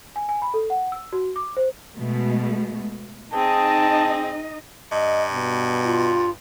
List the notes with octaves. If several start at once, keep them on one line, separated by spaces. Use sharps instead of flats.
G#5
G#5
B5
A4
F#5
E6
F#4
D6
C5
B2 G#3 A3
C4 D#4 G#4 D#5 A5
G2 D#5
B2
F4